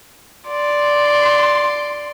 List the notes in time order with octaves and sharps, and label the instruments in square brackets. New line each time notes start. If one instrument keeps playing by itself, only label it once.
[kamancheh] D5 C6